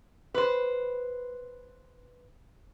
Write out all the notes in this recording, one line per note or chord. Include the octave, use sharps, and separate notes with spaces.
B4 C5